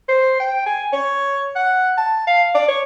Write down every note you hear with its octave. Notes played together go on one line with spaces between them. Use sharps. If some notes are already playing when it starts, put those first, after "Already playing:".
C5
G5
G#5
C#5
F#5
A5
F5
D5
C#5